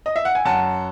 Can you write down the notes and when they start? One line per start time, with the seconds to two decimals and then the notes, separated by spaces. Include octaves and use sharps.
0.06 D#5
0.16 E5
0.25 F#5
0.35 G#5
0.45 F#2 F#5 A5